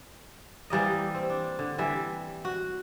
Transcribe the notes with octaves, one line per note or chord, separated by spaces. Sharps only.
E3 G3 A#3 D#5
C4
D4
D3
E3 G3 E5
F#4